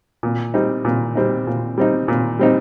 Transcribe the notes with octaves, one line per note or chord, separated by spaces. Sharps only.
A#2
G3 C4 D#4
A#2
G3 C4 D#4
A#2
G3 C4 D#4
A#2
G3 C4 D#4